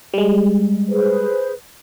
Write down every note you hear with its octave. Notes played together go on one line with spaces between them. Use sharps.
G3 G#3
G#4 B4 C5